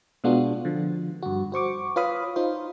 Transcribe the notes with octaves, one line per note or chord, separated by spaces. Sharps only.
B2 G#3 B3 D4 F4 F#4
D3 F3
G2 F#4
F#4 C5 C#6 D6
F4 B4 C#5 F5 B5 D#6
D#4 F4 C5